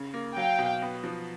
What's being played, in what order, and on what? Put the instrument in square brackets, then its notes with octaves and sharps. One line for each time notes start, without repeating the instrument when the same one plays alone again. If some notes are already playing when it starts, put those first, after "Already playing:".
Already playing: [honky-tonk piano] C#3
A#3
[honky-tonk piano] F#3 [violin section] F5 G5
[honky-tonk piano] B2
B3
F3